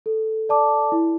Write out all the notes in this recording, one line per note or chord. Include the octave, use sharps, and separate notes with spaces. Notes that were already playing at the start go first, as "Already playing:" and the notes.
A4
D5 A5 D6
E4